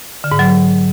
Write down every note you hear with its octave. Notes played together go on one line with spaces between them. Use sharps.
D3
G#2
F#3